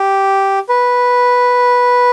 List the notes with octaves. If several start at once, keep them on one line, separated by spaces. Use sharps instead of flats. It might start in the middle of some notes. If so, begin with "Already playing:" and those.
Already playing: G4
B4